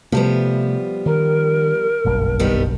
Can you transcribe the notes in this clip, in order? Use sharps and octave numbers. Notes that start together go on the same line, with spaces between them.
C3 F3 G3 A3 B3
D#3 A#4
F#1 B1 G2
D#3 G3 B3